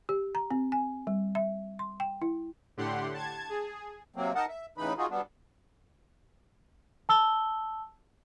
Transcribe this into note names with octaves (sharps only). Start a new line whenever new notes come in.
G4
A#5
C4
G#5
G3
E5
C6
G5
E4
A2 D3 G4 F#5 C6
A5 G#6
G#4
C3 F#3 A#3 C4
D#4 A#4 D#5 F#5 A5
E5
A2 C#3 E3 D#4 B4 B5
D#4 F4 F#4 G#4
F#3 G3 B3 D4
A5 E6 G7